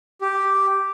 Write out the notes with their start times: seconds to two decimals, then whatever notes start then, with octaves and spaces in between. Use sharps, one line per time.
0.21 G4